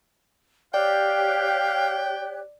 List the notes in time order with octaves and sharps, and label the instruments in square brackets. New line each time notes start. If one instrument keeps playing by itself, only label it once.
[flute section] G4 C#5 F#6 [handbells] D5 [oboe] F5 [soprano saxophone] G5